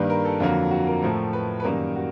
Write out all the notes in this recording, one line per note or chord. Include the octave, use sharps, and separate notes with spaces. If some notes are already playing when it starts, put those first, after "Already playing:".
Already playing: G2 D#3 G3 A#3 B4
A#4
A4
F2 D3 F#3 A#3 F4
F#4
A#4
A2 F3 A3 A#4
B4
B4
F#2 D#3 G3 A#3 A#4
F#4